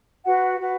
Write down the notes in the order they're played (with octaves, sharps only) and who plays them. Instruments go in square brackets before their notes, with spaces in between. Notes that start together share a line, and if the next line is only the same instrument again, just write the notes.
[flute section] F#4 B4 F#5
F#4 B4 F#5